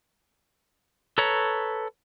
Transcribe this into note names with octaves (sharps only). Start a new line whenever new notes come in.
A4 B4 C#5 A#5